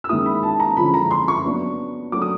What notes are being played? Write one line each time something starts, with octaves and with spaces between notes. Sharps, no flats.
E6
D#3 G#3 C#4 E4 D#6
B5
A5
A#5
D3 F3 G#3 C#4 E4 B5
A#5
C6
C#6
F#3 B3 D4
F#3 A3 D4 D6
D#6